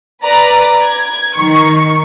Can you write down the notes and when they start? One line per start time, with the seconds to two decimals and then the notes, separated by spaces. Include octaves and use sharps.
0.23 B4 D5 A#5
0.84 G#6
1.36 D#3 C#6